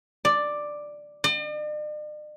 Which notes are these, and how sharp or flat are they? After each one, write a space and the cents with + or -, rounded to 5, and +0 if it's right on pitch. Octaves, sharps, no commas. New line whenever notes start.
D5 +5
D5 +45